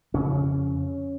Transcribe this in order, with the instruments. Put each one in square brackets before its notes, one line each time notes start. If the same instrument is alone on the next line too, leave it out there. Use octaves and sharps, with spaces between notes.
[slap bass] F2 C#3 C#4